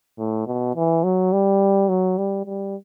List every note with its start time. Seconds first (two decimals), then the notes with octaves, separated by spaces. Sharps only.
0.18 A2
0.47 B2
0.76 E3
1.04 F#3
1.33 G3
1.89 F#3
2.18 G3
2.46 G3